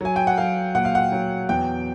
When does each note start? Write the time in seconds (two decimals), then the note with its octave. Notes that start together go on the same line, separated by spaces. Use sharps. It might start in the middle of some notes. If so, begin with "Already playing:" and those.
0.01 F#3 G#5
0.16 G5
0.27 F#5
0.38 F#3 F5
0.75 A#2 F#5
0.85 F5
0.95 F#5
1.12 F#3
1.49 E2 G5